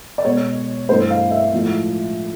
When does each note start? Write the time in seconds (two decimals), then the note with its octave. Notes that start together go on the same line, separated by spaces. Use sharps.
0.18 D5
0.25 B2 G#3 C#5
0.89 G2 E3 A3 C5
1.10 F5
1.31 E5
1.52 A2 F3 G#3